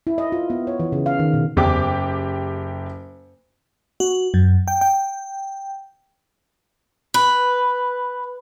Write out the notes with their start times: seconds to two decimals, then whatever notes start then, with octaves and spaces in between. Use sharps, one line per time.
0.07 E4
0.18 D#5
0.32 F4
0.50 B3
0.67 C#5
0.80 E3
0.92 C#3
1.06 F5
1.19 D#3
1.34 B2
1.57 F#1 E2 G4 D6
4.00 F#4
4.34 F#2
4.68 G5
4.81 G5
7.14 B4